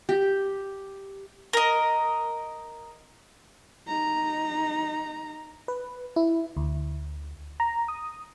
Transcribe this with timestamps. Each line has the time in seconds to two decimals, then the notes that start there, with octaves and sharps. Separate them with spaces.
0.09 G4
1.53 A#4 D#5
3.87 D#4 A#5
5.68 B4
6.16 E4
6.57 D2
7.60 A#5
7.88 D#6